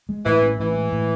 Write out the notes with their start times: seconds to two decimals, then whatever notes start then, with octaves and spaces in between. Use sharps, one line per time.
0.09 G#3
0.25 A2 E3
0.42 C#4
0.59 A2 E3
0.76 G#3
0.92 A2